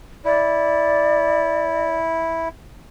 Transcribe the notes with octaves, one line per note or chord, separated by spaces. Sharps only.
E4 D5